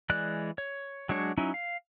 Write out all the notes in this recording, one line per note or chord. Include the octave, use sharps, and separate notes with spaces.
E3 G#3 D5 F#6
C#5
F#3 G#3 D4 C#5
F#3 C#4 D#4 E4
F5